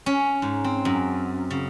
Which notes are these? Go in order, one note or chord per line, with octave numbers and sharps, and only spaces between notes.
C#4
G#2
C4
F#2
C#3